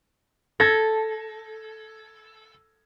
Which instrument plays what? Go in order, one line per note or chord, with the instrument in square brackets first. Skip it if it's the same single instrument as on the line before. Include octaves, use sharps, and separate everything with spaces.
[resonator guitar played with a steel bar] A4 [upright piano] G#6 A#6